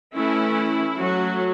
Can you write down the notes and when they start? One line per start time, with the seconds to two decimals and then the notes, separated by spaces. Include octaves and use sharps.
0.15 E3 A3 C#4 E4
0.97 F#3 A3 C#4 F#4